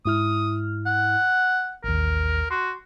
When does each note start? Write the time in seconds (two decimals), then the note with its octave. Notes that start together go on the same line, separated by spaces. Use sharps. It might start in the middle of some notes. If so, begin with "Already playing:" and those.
0.06 G#2 E4 D#6 F6
0.86 F#5
1.84 A1 D#2 A#4
2.51 F#4 C6